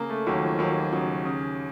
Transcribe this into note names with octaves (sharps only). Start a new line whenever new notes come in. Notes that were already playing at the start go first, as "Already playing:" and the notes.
Already playing: C#3 A#3
A3
D#2 F#3
F3
D#2 F#3
C#3 F#3
C#3